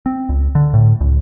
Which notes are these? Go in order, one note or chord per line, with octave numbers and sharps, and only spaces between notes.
C4
C#2
D3
A2
C#2